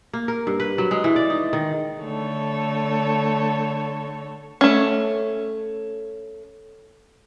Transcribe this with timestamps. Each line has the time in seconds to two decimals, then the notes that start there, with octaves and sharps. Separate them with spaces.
0.13 A#3
0.28 A#4
0.47 G2
0.60 B4
0.78 F#3
0.91 G#3
1.04 E3
1.16 D5
1.30 D#4
1.53 D#3
2.01 D3 A3 A4 C#5
4.61 A3 C#4